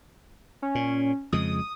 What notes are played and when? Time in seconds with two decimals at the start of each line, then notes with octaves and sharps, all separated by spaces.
0.62 C#4
0.75 A#2
1.32 F2 C#3 G#3 D#6